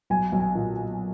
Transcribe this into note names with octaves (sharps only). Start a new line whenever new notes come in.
B1 G#5
B1
G#5
A#2